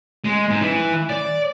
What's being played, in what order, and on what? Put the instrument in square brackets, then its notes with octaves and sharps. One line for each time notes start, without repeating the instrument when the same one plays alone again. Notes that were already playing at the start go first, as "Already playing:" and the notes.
[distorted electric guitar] G#3
G#2
E3
D5